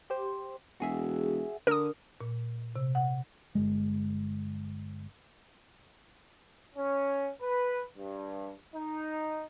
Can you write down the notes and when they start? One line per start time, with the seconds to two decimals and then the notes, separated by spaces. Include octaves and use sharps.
0.10 G4 C5
0.80 E1 F#4 G#4 E5
1.67 D3 A#4 D#6
2.21 A#2
2.76 C3
2.95 F#5
3.55 G1 G#3
6.75 C#4
7.41 B4
7.98 G2
8.74 D#4